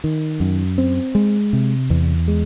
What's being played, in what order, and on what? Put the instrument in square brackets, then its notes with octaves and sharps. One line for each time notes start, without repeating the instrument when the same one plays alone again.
[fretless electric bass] D#3
F#2
C4
G#3
C3
E2
G#3